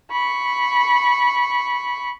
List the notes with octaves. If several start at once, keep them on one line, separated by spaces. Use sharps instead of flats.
B5 C#6